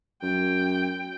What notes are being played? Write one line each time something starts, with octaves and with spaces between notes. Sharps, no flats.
F#2 G5